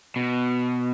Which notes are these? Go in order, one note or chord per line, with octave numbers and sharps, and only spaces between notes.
B2